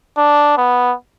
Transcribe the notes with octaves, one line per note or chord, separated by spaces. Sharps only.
D4
B3